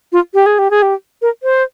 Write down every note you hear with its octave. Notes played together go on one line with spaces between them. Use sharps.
F4
G4
G#4
G4
G#4
G4
A#4
C5